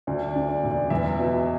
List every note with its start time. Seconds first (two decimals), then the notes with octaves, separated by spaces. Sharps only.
0.07 D2 D5
0.29 D5
0.36 D3
0.49 D5
0.64 E1
0.70 D5
0.90 E2 E5
1.19 B2